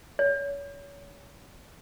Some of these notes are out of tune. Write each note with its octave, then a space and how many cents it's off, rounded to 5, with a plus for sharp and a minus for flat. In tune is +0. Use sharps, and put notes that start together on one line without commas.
C#5 +30